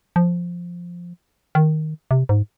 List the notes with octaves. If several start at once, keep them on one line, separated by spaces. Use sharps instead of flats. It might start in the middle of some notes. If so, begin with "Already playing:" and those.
F3
D#3
C3
G#2